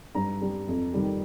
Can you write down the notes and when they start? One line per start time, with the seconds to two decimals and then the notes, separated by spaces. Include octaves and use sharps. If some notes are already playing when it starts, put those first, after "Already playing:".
0.15 G2 A#5
0.41 G3
0.68 F2
0.94 D#3 G3